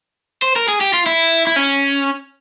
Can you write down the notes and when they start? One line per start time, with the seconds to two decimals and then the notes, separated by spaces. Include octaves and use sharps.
0.42 C5
0.56 A#4
0.68 G#4
0.81 G4
0.93 F4
1.06 E4
1.47 E4
1.56 C#4